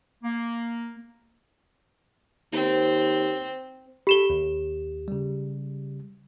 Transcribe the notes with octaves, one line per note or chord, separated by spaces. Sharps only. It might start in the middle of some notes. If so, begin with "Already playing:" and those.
A#3
D#2 C4
G4 A4 B5 E7 G7
D#2
C#3 G3